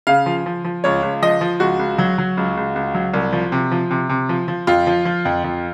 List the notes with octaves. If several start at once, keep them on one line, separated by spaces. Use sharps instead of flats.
C#3 F5
F3
F3
F3
C#2 C#5
C#2
F3 D#5
F3
C#2 F#4
C#2
F#3
F#3
C#2
C#2
C#2
F#3
C2
F3
C3
F3
C3
C3
F3
F3
F2 F4
F3
F3
F2
F2